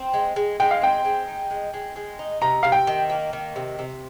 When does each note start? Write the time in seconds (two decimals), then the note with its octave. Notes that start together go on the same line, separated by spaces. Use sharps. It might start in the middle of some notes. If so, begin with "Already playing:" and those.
Already playing: C4
0.13 G#3
0.36 G#3
0.60 G#3 G5
0.71 F5
0.81 C4 G5
1.05 G#3
1.28 D#4
1.50 G#3
1.74 G#3
1.96 G#3
2.19 D#4
2.41 C3 A#5
2.63 C3 F5
2.72 G5
2.87 D#3
3.10 A#3
3.33 D#3
3.56 C3
3.79 C3